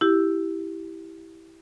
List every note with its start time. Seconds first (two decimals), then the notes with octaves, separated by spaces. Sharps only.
0.01 E4 G4